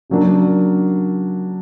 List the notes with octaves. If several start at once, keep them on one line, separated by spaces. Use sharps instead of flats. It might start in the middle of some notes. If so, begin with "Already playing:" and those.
C#3 F#3 A#3 D4